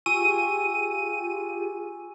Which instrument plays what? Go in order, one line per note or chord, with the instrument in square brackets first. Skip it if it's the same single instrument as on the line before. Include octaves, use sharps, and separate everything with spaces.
[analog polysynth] F4 G4 G#4 [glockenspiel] G#5 C#6 E6 [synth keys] D#7